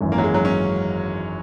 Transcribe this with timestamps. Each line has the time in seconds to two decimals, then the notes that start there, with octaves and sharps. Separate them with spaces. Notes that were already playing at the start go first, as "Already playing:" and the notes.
0.01 G#1 F#2 E3
0.12 A#3
0.18 F#3
0.24 G#3
0.34 F#3
0.45 C#4